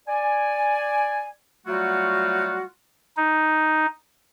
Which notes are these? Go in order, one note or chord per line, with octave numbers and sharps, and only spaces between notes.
D5 G#5
F#3 G3 A3 F4 F#4
D#4